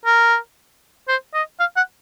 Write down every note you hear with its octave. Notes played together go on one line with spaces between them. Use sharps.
A#4
C5
D#5
F5
F#5